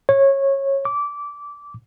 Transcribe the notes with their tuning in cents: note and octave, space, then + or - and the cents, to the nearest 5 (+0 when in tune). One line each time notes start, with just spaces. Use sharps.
C#5 -20
D6 -20